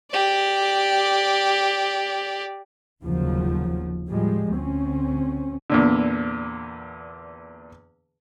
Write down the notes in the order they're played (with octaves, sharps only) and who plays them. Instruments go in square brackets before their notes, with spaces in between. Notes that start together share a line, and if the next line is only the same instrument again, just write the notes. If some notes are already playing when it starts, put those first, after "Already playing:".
[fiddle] G4 D5
[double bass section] F1 D#2 C#3 F3 F#3
A2 F3 G3 G#3
D2 C4 C#4
[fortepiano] E2 A#2 D3